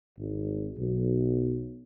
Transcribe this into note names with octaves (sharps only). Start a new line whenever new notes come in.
G#1
B1